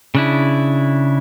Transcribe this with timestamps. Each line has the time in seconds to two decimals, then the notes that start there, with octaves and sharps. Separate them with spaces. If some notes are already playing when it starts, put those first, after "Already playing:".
0.15 C#3 D4 E4